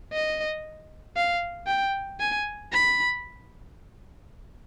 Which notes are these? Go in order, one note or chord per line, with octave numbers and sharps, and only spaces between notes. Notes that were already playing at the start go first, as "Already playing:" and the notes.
D#5
F5
G5
G#5
B5